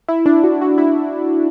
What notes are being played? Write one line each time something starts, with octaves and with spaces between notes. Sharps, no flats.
E4
D4
F#4
F#4
E4